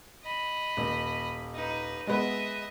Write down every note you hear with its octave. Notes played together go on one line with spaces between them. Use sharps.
D#5 B5
D#1
D#4 B4
G#3 B3 D#5 E5